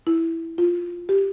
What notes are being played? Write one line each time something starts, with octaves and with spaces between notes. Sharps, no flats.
E4
F4
G4